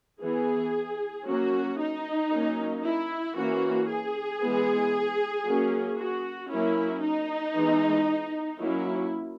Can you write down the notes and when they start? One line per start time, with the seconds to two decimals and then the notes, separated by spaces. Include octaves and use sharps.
0.21 E3 B3 G#4
1.26 F#3 A#3 C#4 F#4
1.79 D#4
2.31 F#3 A#3 C#4
2.83 E4
3.36 E3 A#3 C#4 F#4
3.88 G#4
4.41 E3 G#3 B3
5.45 F#3 A#3 C#4
5.98 F#4
6.50 F#3 A#3 C#4 E4
7.02 D#4
7.55 E3 G#3 B3
8.60 F#3 A#3 C#4 E4